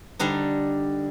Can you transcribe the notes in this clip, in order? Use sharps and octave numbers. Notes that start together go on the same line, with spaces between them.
D3 G3 D4 D#4